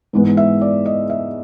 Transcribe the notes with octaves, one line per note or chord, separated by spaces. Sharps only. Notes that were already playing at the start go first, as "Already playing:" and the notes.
G#2 E3 G#3 B3
E5
D5
D#5
E5